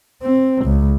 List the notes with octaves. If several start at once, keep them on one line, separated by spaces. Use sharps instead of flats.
C4
C#2